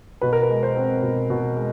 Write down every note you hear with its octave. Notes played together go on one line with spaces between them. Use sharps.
B2 B4
A#4
B4
G#3
C5
C4
B2
B2
G#3